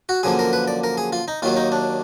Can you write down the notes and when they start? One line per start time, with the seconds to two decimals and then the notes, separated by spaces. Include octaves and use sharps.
0.09 F#4
0.23 F#2 D3 F3 A#3 G#4
0.39 A#4
0.53 B4
0.68 D5
0.84 A#4
0.97 G#4
1.13 F4
1.28 D#4
1.42 D#2 D#3 F#3 A#3 F4
1.56 D#4
1.72 D4